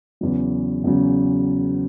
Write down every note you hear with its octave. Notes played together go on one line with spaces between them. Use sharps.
E2 C#3 F#3
E2 C#3 F#3